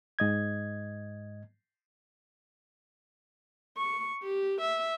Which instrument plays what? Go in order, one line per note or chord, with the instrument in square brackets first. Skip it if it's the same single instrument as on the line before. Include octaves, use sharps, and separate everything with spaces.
[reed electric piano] G#2 D#5 G#6
[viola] C#6
G4
E5